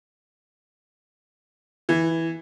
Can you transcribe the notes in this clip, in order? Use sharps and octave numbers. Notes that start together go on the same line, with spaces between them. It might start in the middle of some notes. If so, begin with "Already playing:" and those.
E3